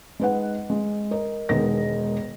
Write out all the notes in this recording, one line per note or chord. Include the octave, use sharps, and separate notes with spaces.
G#3 D#4 B4 D#5 F#5
G#3
A#4 D#5
E1 D#3 G#3 B3 D#5 A#6